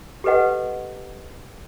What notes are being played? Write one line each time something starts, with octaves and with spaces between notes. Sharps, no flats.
G4 A4 B4 D#5 F#5